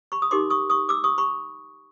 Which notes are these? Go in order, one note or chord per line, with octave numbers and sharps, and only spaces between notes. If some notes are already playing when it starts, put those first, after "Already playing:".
B5 C#6
D#6
D#4 G4 A#4 C6 D6
C#6 D#6
C#6 D#6
D6 E6
C#6 D#6
B5 C#6